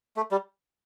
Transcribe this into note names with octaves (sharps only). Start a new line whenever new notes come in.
A3
G3